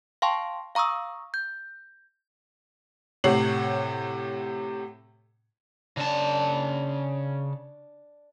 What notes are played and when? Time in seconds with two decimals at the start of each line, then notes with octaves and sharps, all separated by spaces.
0.22 F5 G5 A5 C6 C#6
0.75 F5 A#5 C#6 D#6 E6
1.34 G6
3.24 A2 C3 C#5 F#5 C7 F#7
5.97 C#3 D4 A5